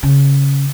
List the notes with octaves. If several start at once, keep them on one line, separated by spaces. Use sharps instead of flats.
C#3